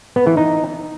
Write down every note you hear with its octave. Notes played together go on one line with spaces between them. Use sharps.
B3
E3
D#4